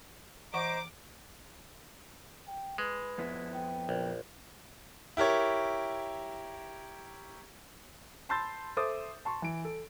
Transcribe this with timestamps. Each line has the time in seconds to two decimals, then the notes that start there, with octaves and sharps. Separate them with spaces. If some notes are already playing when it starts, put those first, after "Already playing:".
0.54 E3 C5 D#5 F#5 A#5 C#6 D6
2.48 G5
2.78 G#3 B4
3.18 F2 B3 E4
3.54 G5
3.89 A#1
5.17 E4 G4 A#4 C#5
8.29 A5 B5 C6 E6 G6 A6
8.77 A4 C5 E5 D6 D#6 A6
9.25 A5 C6 C#6
9.42 E3 D7
9.65 A4